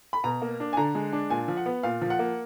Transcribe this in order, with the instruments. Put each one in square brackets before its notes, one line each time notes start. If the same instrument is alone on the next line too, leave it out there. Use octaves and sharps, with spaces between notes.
[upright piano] B5
B2 A#5
A#3
D4
G#5
D3 A#5
G#3
D4
A#2 G#5
F3
F#5
B3
A#2 F5
F3
F#5
A#3